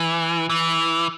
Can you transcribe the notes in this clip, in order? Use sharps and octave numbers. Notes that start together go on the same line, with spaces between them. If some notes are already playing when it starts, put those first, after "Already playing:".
Already playing: E3
E3